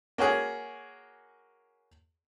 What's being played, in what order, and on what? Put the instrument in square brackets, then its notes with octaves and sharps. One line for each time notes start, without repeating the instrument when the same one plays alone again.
[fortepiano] A#3 C#4 F#4 G#4